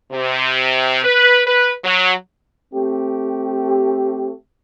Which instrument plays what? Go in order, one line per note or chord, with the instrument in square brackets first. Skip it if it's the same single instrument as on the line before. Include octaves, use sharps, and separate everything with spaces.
[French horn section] C3
B4
B4
F#3
[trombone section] A3 C4 G4